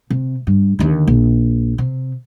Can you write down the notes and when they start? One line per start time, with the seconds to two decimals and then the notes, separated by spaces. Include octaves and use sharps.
0.10 C3
0.47 G2
0.79 D#2 D3
1.07 A#1
1.78 C3